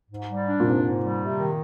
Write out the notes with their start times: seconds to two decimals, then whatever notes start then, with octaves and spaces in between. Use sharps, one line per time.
0.10 G#2
0.28 G3
0.46 D4
0.60 A#2
0.64 G#2 C3
0.83 G#2
1.02 G3
1.19 C3
1.37 D#3